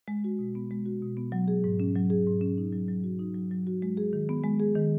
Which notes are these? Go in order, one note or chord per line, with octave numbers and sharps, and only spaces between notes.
G#3
F#4
B2
B3
G#3
F#4
B2
B3
F#3
G#4
G#2
C#4
F#3
G#4
G#2
C#4
D#4
F#3
F#3
F#4
D#4
F#3
F#3
F#4
G#3
G#4
D#3
B3
G#3
G#4
D#3